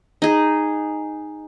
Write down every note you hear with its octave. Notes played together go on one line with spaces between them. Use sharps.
D#4 G#4